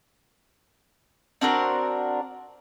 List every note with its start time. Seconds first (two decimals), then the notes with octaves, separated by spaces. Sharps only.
1.41 C4 D4 F#4 A#4